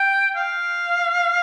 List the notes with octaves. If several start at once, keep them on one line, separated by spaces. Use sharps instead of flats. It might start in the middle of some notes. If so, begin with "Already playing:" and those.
Already playing: G5
F5